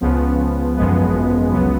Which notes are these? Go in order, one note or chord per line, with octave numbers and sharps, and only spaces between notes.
C#2 C#3 F3 B3
G#1 F#2 F3 G#3 B3
C#2 C#3 F#3 B3